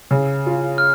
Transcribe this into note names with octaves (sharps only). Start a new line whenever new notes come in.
C#3
F4
F6